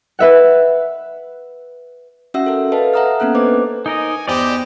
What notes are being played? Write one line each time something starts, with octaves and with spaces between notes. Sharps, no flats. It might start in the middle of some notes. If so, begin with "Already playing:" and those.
B4 E5 F#5
C#4 F#4 E5 F#5 E6
A4 A#4
A4 B4 D#5 F5 A5
E5 F#5 A#5 D#6 F6
A#3 B3 C#4 A4 F#6
D4 B4 C5 D#5 D6
D#4 A#4 D#5 G#5
E2 G4 C5 D5 D#5